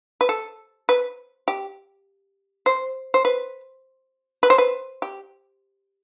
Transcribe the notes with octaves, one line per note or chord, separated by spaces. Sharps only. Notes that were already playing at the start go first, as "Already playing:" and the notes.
B4
A4
B4
G4
C5
C5
B4
B4
C5
B4
G4